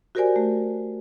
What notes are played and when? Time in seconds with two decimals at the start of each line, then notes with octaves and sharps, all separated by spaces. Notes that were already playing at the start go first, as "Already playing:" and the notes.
0.15 F#4 G4 A#4 C5 D5 G#5
0.36 A3